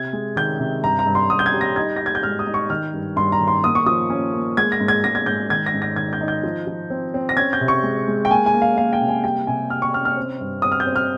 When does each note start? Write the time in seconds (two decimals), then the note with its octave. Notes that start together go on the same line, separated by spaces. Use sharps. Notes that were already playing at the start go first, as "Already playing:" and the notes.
Already playing: C3 G#6
0.13 G#3
0.36 D#3 G6
0.59 C3
0.83 G2 A#5
0.99 A#5
1.06 G2
1.15 C6
1.30 G2 D#6
1.39 G6
1.46 G#6
1.53 G3
1.61 A#6
1.76 D#4 G#6
1.96 D#4 A#6
2.06 G#6
2.15 G6
2.23 G#2 F6
2.39 D#6
2.47 D#4
2.54 C#6
2.70 D#3 F6
2.94 G2
3.16 G2 C6
3.32 A#5
3.40 D#3
3.48 C6
3.63 A#3 D#6
3.75 C#6
3.86 F3 D#6
4.10 C#4
4.33 A#3
4.57 G#3 G#6
4.72 A#6
4.80 G#2
4.88 G#6
5.04 G#2 A#6
5.15 G#6
5.26 G#2 G6
5.50 D#3 G#6
5.66 A#6
5.74 G#2
5.82 A#6
5.96 D#3 G#6
6.13 G6
6.21 D#4
6.28 G6
6.43 F3
6.67 F3
6.90 C4
7.14 C4
7.29 A#6
7.36 C#4 G#6
7.53 G6
7.61 C3
7.68 C#6
7.83 G#3
8.08 G#3
8.25 G5
8.30 A#3 G#5
8.46 G#5
8.54 A#3
8.62 F5
8.78 A#3 F5
8.93 G5
9.01 C3
9.09 G#5
9.23 G3 G5
9.47 C3 G#5
9.70 C3 F6
9.82 C#6
9.94 C#4 F6
10.05 F6
10.17 C4
10.40 G2
10.62 C4 D#6
10.72 F6
10.80 G6
10.87 C4
10.96 F6